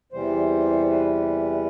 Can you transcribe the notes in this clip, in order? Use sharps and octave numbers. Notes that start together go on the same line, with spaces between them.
E2 C3 E3 G3 C5
B4